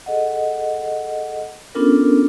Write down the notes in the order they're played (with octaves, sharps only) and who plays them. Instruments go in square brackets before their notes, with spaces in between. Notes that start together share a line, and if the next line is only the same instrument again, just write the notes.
[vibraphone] G#4 A4 D#5 F#5
B3 C#4 D4 F4 A4 A#4